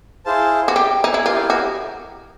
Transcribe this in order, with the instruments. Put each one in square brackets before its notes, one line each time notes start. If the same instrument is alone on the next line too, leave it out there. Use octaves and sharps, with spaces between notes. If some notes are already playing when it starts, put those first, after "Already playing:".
[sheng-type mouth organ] E4 G#4 C5 F5 A5
[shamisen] F#4
G4
D#4
E4
[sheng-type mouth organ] E4 G4 A#4 [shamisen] F4
[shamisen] F#4